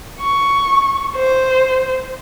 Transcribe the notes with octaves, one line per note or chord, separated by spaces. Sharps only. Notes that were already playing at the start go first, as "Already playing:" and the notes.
C#6
C5